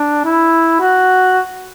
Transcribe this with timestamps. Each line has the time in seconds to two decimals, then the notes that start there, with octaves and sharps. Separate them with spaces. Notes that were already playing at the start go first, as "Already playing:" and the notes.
Already playing: D4
0.25 E4
0.80 F#4